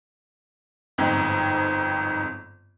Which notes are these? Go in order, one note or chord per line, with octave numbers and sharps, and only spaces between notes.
G1 F2 G#2 G#3 C4